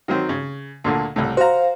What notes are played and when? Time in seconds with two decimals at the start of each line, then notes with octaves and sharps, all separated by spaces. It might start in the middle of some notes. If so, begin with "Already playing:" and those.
0.08 D#3 F#3 C4
0.29 C#3
0.84 D2 A#2 D3
1.16 C2 A2
1.37 F#4 C5 F5 A#5